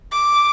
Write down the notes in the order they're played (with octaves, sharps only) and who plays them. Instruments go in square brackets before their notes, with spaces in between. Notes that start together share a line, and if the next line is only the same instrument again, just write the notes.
[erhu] D6